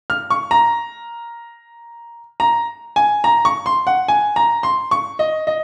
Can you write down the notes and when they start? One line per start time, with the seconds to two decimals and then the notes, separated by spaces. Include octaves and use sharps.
0.10 F6
0.30 C#6
0.51 A#5
2.40 A#5
2.96 G#5
3.24 A#5
3.45 C#6
3.66 C6
3.87 F#5
4.08 G#5
4.36 A#5
4.63 C6
4.91 C#6
5.19 D#5
5.47 D#5